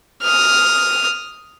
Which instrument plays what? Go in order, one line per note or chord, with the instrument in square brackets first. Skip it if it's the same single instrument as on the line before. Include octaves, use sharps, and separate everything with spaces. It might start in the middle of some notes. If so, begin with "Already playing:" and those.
[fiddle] D#6 F6